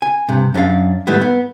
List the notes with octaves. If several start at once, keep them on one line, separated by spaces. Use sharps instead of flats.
G#5
G2 C3
F#2 C#4 D4 A4 F5
G#2 D#3 G3 A3 B3 E4
B3